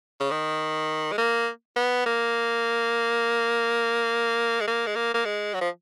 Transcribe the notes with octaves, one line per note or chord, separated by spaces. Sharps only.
C#3
D#3
G#3
A#3
B3
A#3
G#3
A#3
G#3
A#3
A#3
G#3
F#3
F3